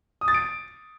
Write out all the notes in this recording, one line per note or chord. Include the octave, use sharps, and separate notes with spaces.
D#6
A6
D7